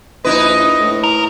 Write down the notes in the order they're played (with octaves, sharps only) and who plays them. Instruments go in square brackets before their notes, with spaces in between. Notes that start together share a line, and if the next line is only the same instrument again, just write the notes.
[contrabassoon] A#1 [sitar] D#4 E4 B4 [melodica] D#5
[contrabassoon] A2
[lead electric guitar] A#4